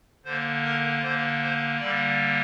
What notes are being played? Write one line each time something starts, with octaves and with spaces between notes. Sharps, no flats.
D3 A#3 C5
A#4
D3 A#3 C5
C5
D3 G3 A#3 D5